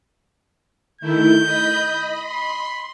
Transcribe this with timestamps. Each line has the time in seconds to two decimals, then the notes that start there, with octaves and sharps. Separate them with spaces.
1.01 D#3 A3 E4 G6
1.43 D#5 B5
2.24 B5 C6